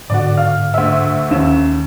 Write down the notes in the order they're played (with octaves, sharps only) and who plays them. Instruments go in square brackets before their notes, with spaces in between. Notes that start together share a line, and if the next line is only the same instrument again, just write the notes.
[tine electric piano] G#2 D3 [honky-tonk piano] F#4 D5
[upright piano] F5 [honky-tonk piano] F6
[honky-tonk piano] D2 E5
[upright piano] D#2 E7 [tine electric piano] C#4